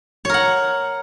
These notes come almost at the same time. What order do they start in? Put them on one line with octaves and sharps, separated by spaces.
C#5 A#4 F#5